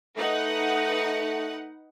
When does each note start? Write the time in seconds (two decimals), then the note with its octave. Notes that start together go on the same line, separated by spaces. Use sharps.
0.16 A3 D#4 B4 F#5